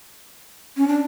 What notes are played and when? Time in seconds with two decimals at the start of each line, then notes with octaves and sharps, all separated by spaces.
0.77 C#4
0.87 D4